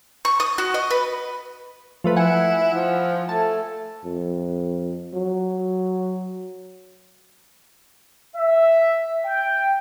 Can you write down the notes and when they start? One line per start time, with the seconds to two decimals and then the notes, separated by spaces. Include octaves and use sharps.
0.25 C#6
0.40 D#6
0.58 F#4
0.74 D#5
0.91 B4
2.04 F3 A3 B4
2.16 E4 F#5 G#5 C#7
2.74 F3
3.29 A3 G#5 A5
4.04 F2
5.14 F#3
8.36 E5
9.26 G5